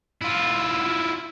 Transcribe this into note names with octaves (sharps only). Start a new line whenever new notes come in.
E4 F4